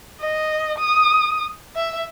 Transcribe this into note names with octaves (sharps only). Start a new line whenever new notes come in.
D#5
D#6
E5